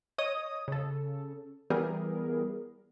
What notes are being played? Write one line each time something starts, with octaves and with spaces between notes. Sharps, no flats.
C#5 D#5 D#6
C#3 A4
E3 G3 B3 G#4 A#4